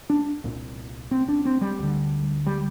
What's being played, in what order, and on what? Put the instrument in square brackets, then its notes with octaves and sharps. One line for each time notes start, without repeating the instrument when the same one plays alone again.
[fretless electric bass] D4
C2 A#2
C4
D4
C4
G3
D2 D3
G3